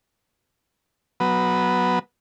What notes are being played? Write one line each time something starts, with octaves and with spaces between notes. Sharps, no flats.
F#3 B3